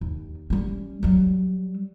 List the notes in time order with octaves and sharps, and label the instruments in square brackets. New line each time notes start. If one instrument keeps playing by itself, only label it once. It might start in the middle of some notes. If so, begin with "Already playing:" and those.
[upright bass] D#2
G3 C#4
F#3 G3